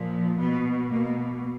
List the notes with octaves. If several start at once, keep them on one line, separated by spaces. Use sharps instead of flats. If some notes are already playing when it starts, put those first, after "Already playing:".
Already playing: A#2 F3
B2 B3
B2 A#3